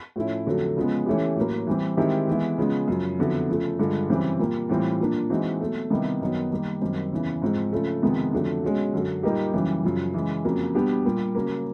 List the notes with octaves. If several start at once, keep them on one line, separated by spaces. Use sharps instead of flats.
A2 F3 A3 C#4 E4
F2 D3 F#3 A3
C#3 F3 G#3 B3
E3 A3 C#4 E4 G4
A2 F#3 A#3
E3 G3 C4
D#3 G#3 C4 E4 G4
E3 G#3 B3 E4
C#3 F3 G#3 B3
F#2 C#3 F3
F2 D3 F#3 B3 E4
C#3 F3 A3
G2 D3 F3 G#3
F#2 C#3 E3 G3 C4
A#2 G3 A#3
A2 E3 G3 C4 F4
A#2 F3 A#3 D4
E3 G#3 C4 D#4 F#4
B2 F#3 A3
C3 D#3 G3 B3 E4
F#2 D#3 F#3 B3
D#3 G3 A#3
F#2 D#3 G3 C4
E2 C#3 E3
G#2 F3 G#3 C4
C#3 F3 A3
F2 C3 D#3 G#3 B3
F2 D3 F#3 A3 D4
B2 G#3 C#4 F#4
F#2 D3 F#3
A#2 G3 A#3 D#4 G4
F#2 C#3 E3 G3
F#2 C#3 F3
C#3 E3 G#3
F2 C#3 F#3 A#3
B2 G3 B3 D4 G4
A#2 G3 A#3
C#3 F#3 A#3